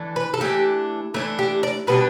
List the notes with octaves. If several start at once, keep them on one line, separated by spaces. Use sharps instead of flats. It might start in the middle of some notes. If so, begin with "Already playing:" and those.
Already playing: E3 A3 D4
B4
A4
E3 A3 D4 G4
E3 A3 D4 E4
G4
D5
B2 G3 B3 D4 B4